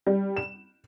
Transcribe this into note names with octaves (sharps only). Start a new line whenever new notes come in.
G3
E7